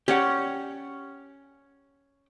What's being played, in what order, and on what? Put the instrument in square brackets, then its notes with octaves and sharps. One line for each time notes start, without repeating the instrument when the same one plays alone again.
[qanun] C#4 [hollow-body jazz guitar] G4 D5 F#5